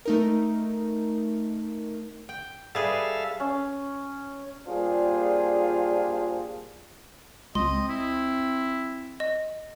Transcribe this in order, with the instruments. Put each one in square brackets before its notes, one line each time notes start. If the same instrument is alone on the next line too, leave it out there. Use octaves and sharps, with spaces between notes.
[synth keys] A3 D#4 A#4
[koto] G5
[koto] G3 G#4 B4 [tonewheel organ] A4 E5 F5
[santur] C#4
[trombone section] A#2 G3 D4 F4 G#4 C5
[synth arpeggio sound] C#2 [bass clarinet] C4 [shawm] D#5 [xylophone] C6
[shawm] E4
[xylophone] D#5